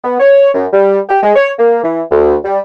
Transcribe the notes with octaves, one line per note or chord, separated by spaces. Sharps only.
B3
C#5
F#2
G3
G4
G#3
C#5
A#3
E3
D2
G3